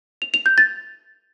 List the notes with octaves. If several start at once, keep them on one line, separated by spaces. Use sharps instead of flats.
F7
F7
G6
A6